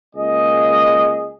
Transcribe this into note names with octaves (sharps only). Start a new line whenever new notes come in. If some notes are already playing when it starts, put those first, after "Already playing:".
C#2 A#3 G#4 D#5